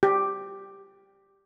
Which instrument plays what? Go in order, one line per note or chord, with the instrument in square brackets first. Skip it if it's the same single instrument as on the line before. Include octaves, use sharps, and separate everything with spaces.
[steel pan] G4